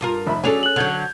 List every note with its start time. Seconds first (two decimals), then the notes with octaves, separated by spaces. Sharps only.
0.01 G2 F4 A#4
0.27 F1 E5 B5
0.44 F#3 C#4 D4 G#4 A4 G#5 F7
0.63 F#6 F#7
0.76 D3 F#3 G6 G#6 F7